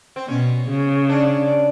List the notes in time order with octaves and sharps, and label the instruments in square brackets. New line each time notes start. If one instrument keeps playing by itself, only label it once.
[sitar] C4
[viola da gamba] B2 [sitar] C#4
[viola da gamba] C#3
[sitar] D4